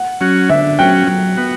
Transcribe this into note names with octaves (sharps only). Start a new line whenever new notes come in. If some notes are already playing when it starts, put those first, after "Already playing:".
Already playing: F#5
F#3 C#4 F#4
D3 E5
F#3 C#4 F#4 G5
F#3
B3 F#4